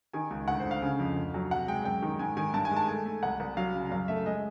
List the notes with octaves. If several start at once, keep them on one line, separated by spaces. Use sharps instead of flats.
D#3 G#5
C#2
D2 F#5
C5
D2
F5
C#3
F2
D2
F#3
C3 F#5
G#3 G5
F#2 G5
D#3
G#2 G#5
D#3 G#5
G2 A5
G#5
G#3 A5
A3 G#5
A3
C2 F#5
C2
F#3 F5
C#3
F#2 F5
A3 E5
G#3 D#5